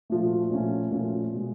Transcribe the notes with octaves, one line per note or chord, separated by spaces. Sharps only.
A#2 F3 A3
A#2 F3 A3 C#4
A#2 F3 A3 C#4
B2 G#3